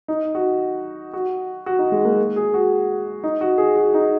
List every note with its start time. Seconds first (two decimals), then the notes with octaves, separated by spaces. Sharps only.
0.08 D#4
0.35 F#4
1.13 F#4
1.66 F#4
1.79 D#4
1.92 G#3
2.05 A#3
2.36 G#4
2.54 F#4
3.24 D#4
3.41 F#4
3.58 G#4
3.76 F#4
3.94 D#4